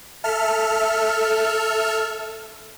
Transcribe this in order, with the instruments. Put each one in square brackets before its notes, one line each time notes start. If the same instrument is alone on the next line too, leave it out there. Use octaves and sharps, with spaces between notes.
[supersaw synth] A4 E5 F6